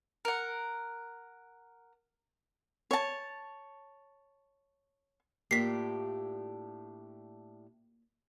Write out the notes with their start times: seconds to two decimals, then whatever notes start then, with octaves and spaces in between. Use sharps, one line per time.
0.25 A#4 F#5
2.91 C#5 A5
5.51 A2 A#3 D4 F4 G4 B6 C7